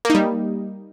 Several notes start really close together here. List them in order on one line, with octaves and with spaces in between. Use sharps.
A#3 D#4 G3